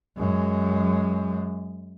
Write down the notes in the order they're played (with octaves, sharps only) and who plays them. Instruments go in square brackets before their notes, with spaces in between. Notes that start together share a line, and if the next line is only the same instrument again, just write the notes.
[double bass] F#2 G#3